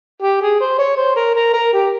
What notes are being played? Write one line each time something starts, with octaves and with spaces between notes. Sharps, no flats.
G4
G#4
C5
C#5
C5
A#4
A#4
A#4
G4